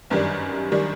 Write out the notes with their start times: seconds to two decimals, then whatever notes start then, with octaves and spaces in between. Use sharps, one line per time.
0.10 G1 F#2 D#3 G3 D4
0.72 D#3 G3 D4